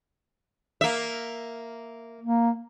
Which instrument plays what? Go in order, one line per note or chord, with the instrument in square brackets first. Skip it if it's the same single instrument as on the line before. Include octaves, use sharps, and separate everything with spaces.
[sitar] A#3 E5
[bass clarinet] A#3